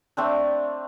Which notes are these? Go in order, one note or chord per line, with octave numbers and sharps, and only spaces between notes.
A3 C4 D4